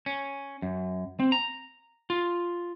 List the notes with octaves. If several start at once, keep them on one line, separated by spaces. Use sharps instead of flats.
C#4
F#2
C4
A#5
F4